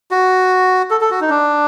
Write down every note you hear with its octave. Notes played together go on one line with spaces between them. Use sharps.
F#4
A4
A4
F#4
D#4
D4